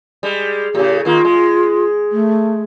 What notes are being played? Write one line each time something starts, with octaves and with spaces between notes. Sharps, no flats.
G3 G#3
A2 C#3 G4
D#3 A#3 F4
G#3
A3